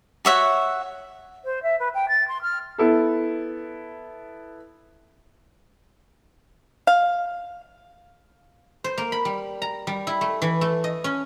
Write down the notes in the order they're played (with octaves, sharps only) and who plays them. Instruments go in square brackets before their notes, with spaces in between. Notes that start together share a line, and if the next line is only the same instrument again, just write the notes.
[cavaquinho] F#4 C#5 E5 F#5
[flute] C5
E5
B4
G5
A6
C6
F6
[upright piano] B3 E4 A4
[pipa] F5
[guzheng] C5
A#3
B5
G3
A#5
G3
E4
A3
E3
A3
D#5
C#4